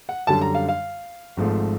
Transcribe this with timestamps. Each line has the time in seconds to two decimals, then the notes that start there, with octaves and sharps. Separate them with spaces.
0.09 F#5
0.27 F#2 D3 G3 A5
0.42 A#5
0.55 F5
0.69 F5
1.37 G#1 G#2 F3 A3